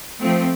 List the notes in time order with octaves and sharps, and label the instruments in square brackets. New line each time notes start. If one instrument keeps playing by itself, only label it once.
[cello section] F3 A3 C4